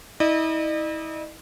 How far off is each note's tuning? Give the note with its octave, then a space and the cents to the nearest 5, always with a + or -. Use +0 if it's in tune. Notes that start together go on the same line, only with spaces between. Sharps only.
E4 -40 D#5 -45